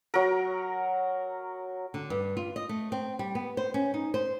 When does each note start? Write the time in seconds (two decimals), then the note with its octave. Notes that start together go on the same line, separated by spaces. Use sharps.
0.14 F#3 A#4
1.94 D3
2.10 G2
2.37 F4
2.56 D#5
2.69 A3
2.92 C4
3.19 G3
3.35 B3
3.57 C5
3.74 C#4
3.94 D#4
4.14 C5